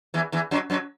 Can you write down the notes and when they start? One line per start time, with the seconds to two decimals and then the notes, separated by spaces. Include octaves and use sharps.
0.14 E2 E3
0.32 E2 E3
0.51 F#2 F#3
0.70 F#2 F#3